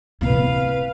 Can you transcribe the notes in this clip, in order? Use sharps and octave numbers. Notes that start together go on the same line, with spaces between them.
C3 E4 B4 F5